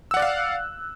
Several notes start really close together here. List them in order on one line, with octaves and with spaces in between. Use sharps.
E6 F#5 D5 F#6 F5